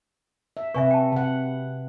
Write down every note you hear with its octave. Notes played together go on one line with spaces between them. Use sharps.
E5
C3 B4 E5 G#5 C#6
G5 A5
C3 F#5